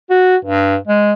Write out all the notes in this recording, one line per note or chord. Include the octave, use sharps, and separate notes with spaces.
F#4
G2
G#3